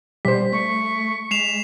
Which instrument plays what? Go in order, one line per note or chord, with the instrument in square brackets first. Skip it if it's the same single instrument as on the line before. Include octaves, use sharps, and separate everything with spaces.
[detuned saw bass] B2 [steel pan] G3 C5 [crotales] B6
[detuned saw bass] A3 [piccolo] C#6
[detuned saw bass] G#3 [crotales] C7 E7 F7